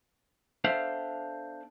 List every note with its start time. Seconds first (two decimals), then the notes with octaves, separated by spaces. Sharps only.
0.64 B3 D4 A4 C5 E5 F5